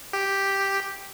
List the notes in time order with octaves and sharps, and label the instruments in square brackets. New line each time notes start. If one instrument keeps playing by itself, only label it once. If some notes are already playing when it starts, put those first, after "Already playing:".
[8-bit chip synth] G4